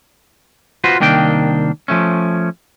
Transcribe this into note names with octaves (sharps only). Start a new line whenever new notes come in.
F4 F#4 B4 C5
C2 D#3 A#3 D4 G5
F3 A3 C#4